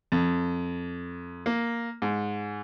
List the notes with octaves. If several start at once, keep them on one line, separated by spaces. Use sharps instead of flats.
F2
A#3
G#2